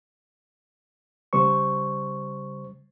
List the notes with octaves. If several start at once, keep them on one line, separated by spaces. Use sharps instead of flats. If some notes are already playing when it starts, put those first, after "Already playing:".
C#3 G3 C5 C#6